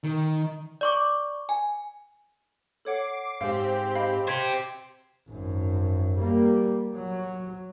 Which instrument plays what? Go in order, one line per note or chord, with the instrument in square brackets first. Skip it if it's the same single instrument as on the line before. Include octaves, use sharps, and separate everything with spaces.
[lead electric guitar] D#3
[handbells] D5 C#6 D6
G#5
[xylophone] A4 C#5 F#5 [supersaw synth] D6 C7
[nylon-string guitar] G#2 [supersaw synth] C4 G4 [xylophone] F5
[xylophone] D#5 F5 B5
[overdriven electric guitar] G4 C5 [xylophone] G#6
[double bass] G#1 F#2
G3 A#3
F#3